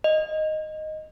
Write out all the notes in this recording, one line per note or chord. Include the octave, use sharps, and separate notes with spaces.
D#5